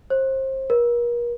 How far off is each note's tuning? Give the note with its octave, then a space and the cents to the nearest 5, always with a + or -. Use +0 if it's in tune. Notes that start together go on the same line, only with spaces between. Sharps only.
C5 +30
A#4 +40